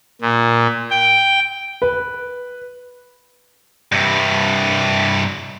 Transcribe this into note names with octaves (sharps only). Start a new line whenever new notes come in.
A#2
G5
B4
G2 C3